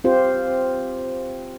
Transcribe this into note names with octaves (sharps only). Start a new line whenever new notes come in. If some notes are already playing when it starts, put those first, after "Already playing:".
C4 F4 G4 C5